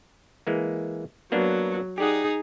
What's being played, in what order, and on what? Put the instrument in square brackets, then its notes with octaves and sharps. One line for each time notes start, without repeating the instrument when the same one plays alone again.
[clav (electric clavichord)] E3 G#3 A#3
[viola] F#3 [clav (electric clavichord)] A#3 B3 D4
[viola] D#4 G#4 [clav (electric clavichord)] G4 D5 F#5